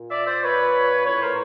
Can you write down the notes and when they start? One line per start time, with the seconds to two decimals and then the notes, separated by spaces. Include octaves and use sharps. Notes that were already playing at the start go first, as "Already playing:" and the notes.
Already playing: A#2
0.10 D5 E5
0.27 C5 D5
0.42 B4 C#5
1.05 A2 E3 B4 C#5
1.21 A#4 C5